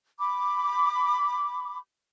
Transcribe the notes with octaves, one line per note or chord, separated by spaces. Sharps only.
B5 D6